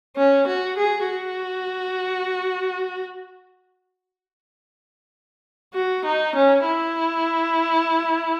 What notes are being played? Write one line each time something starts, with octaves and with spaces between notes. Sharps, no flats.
C#4
F#4
G#4
F#4
F#4
D#4
C#4
E4